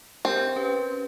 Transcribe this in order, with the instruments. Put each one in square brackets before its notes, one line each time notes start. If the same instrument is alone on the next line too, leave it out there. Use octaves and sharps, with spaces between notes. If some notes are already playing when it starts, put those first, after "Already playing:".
[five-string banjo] C4 [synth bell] G4 A#4 C5
[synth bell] C#4 G4 B4